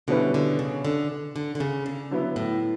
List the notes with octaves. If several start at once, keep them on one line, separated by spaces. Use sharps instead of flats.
B2 D3 G3 C#4 E4 B4
D3
C#3
D3
D3
D3
C#3
D3
D3 F#3 B3 E4
A2